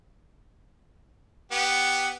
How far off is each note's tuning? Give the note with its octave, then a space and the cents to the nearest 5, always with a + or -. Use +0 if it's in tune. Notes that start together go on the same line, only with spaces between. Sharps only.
B3 +0 G4 -10